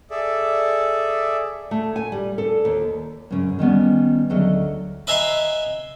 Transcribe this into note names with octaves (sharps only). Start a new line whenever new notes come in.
G#4 A4 D5 E5
A3
G#5
G3
A4
D#2
F#2 C#3
D#3 G3 B3 C#4
D2 F#3 A4 A#4 D#5
B4 D#5 E5 G#5 A#5 C6